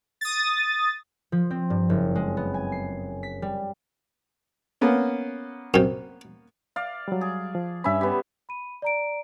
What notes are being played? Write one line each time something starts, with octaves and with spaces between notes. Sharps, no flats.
D#6 A6
F3
C4
G2
F#1
G#3
B3
G#5
C7
B6
G3
A#3 B3 C#4
F#2 C3
D5 F5
F#3 G3
G#4
F3
G2 C#4 E5 G#5 B5
G3 B3
B5 D#7
D5 A#5 D7